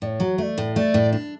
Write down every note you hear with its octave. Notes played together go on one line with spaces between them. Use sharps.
A2 C#5 D5
F#3
A3 D5 E5
A2
A3 D5
A2
D4